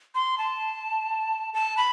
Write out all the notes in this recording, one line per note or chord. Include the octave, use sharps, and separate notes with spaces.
C6
A5
A5
B5